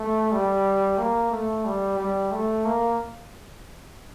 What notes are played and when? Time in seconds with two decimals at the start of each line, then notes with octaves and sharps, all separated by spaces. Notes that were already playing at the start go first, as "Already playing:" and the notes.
Already playing: A3
0.32 G3
0.98 A#3
1.31 A3
1.65 G3
1.98 G3
2.32 A3
2.65 A#3